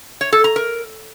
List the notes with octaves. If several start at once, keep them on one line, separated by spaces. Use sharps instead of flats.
C#5
A4
A#5
A#4